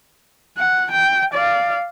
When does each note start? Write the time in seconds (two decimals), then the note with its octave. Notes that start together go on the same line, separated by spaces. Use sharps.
0.58 F#5
0.91 G5
1.34 D5 F5